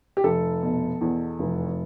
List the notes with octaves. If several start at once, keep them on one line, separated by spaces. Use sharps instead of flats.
G4
F1 A4
B2
E2
F1